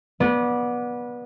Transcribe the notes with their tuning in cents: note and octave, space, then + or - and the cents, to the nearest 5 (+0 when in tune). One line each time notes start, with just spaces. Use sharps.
B3 -25 D5 +0